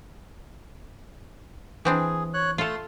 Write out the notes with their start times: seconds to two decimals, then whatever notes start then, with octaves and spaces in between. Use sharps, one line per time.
1.85 E3 C4 D4 G#4
2.34 C#5 F#6
2.58 A3 F4 A4 C6